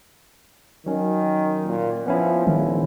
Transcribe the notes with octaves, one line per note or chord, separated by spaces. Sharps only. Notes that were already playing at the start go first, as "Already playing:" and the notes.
D#3 F#3 C#4
A#2
F3 B3 C#4 E4
A#1 D#3